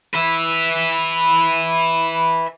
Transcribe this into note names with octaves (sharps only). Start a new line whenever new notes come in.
B4 E5